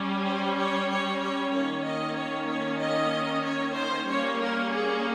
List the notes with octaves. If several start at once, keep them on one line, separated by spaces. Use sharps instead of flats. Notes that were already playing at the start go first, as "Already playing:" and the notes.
Already playing: G3 C#4
C5
C#5
C#5
C#5
D#3 A#3 C#4 C#5
D#5
C#5
C#5
D#5
C#5
C5
G3 A#3 C#4 C#5
A#4
G#4